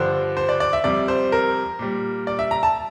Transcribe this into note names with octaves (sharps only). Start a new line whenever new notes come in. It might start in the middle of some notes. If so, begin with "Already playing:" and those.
Already playing: G2 D3 F3 C5
C5
D5
D5
E5
F2 C3 G3 D5
C5
A#4
A#2 G3
D5
E5
A#5
A5